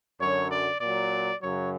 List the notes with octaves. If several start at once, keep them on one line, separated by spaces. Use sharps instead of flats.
F#2 D3 F#3 C#5
D5
A#2 F#3 D5
F#2 C#3 F#3 C#5